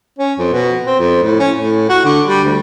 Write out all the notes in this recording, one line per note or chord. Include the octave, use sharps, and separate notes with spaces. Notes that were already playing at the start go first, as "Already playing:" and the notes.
C#4
F2
B2
C4
F2
A2
C#4
A2
F#4
D3
G3
D2